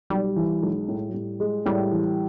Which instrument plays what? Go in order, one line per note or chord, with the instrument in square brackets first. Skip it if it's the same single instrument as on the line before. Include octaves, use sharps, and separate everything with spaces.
[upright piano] B1 [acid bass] G3
[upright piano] E3
[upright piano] B1 [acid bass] G#3
[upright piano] A2
[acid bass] F#3
[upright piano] A2 [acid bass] G3
[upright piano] G#3
[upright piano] A2 [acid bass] G3
[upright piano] E3